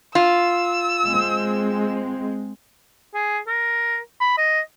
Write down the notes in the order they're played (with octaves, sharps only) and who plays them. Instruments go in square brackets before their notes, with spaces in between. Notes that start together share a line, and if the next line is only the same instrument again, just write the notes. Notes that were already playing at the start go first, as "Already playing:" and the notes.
[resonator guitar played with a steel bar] F4 [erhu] E6
[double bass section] G#3 C4
[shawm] G#4
A#4
B5
D#5